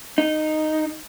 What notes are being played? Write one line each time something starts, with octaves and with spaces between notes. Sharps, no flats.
D#4